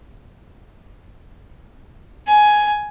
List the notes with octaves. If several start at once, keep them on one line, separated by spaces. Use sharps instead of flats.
G#5